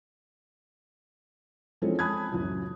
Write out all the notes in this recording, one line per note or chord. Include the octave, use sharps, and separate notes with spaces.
E3 F3 G#3 C4 C#4 A4
G#5 A5 B5 D#6 F#6 G#6
C#2 F#2 A2 E3